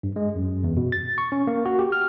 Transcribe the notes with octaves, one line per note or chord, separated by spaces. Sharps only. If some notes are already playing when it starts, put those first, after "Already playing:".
G2
G#3
F#2
E2
B2
A6
C#6
C#4
A#3
F#4
G4
F6